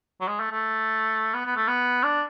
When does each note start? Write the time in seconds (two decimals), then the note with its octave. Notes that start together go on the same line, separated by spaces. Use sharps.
0.21 F#3
0.28 G#3
0.40 A3
0.52 A3
1.34 B3
1.46 B3
1.57 A3
1.68 B3
2.04 D4